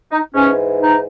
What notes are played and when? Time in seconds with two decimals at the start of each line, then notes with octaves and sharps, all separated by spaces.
0.11 D#4
0.34 G#2 E3 C#4
0.80 D#4